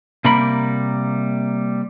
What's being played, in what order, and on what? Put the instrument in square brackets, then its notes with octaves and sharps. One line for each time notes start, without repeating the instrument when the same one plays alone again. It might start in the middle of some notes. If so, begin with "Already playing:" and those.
[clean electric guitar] C3 G3 A#3 A#4 B5